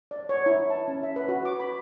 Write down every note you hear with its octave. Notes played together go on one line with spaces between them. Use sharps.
D5
C#5
E4
A5
C#4
E5
B4
F#4
D6
B5